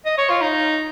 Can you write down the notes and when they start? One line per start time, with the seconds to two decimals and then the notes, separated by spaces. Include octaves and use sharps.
0.06 D#5
0.18 C#5
0.29 F4
0.41 D#4